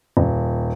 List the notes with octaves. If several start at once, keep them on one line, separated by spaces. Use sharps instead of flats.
D#1